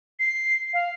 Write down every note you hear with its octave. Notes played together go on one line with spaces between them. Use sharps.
C7
F5